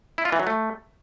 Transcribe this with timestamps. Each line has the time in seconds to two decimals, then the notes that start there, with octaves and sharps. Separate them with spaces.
0.18 E4
0.25 F4
0.32 E3
0.40 F#3
0.47 A3